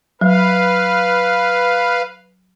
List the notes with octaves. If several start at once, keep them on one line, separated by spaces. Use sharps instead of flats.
F#3 B4 F5